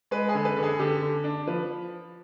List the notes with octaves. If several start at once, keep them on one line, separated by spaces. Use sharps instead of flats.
G#3 B4
G#4
D3
B4
D3
G#4
D3 G4
D3
D4
F3 B4